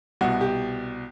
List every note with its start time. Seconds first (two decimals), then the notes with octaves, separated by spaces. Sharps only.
0.21 C2 B2 F#4
0.41 G4